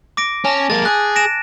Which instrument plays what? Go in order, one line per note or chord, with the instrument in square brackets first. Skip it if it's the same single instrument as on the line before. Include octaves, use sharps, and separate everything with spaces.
[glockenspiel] D6 A#6 D7
[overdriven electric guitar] C#4 [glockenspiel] G#5 A5 A#6
[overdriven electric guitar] G#3 A#3 [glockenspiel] A6
[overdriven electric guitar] G#4 [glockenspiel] F#6
[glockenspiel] A#6 D7 E7